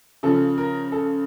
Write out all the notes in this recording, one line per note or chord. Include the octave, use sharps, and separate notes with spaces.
C#3 F3 A4
A#4
A4